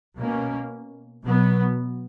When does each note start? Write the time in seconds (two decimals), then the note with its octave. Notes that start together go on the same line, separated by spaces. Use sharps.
0.16 B2 A#3 C#4
1.22 B2 F#3 B3